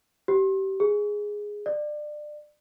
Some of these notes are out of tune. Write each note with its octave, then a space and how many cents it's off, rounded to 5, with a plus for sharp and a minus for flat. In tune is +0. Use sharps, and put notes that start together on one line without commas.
G4 -25
G#4 -5
D5 +25